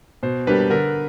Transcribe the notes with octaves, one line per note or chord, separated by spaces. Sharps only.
B2 C5
G3 A#3 D4 G4 B4
D3 A#4